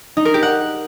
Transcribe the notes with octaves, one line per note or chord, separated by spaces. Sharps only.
D#4
A#4
G4
F#5